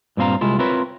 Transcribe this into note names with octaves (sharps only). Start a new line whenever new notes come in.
G2 A#2 C4 F5 A#5
C2 G#3 E4 F4
C4 E4 F4 A#4 B4 C#5